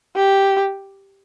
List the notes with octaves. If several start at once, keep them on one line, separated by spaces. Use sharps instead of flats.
G4